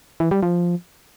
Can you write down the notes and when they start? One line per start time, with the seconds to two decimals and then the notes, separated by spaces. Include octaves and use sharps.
0.20 E3
0.31 G3
0.43 F3